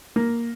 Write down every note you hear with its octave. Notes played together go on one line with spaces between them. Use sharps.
A#3